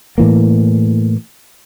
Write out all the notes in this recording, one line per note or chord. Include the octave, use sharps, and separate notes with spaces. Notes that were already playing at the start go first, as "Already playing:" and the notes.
A2 E3 A#3